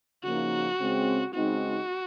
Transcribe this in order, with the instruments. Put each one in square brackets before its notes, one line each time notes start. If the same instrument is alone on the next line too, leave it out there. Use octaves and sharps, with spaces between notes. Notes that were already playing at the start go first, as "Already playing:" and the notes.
[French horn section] C#3 F3 A#3 D#4 [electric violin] F#4
[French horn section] C#3 G#3 C4
[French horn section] C#3 G#3 C4 D#4 [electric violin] F#4